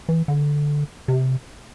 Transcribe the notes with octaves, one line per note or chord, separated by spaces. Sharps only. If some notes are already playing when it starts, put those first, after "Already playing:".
E3
D3
C3